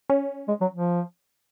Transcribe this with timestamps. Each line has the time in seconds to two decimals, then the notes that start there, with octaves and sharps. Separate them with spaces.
0.10 C#4
0.48 G#3
0.61 F#3
0.74 F3